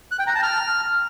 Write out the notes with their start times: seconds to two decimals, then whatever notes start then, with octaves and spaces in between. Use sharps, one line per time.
0.11 F#6
0.19 G5
0.27 A#5
0.35 A5
0.43 F6